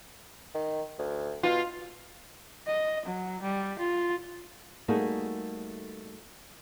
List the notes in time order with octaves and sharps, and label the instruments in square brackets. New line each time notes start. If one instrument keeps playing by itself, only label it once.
[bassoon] D#3
D2
[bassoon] B2 [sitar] F4
[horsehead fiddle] D#5
F#3
G3
F4
[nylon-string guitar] G3 A3 A#3 D#4 F#4 G#4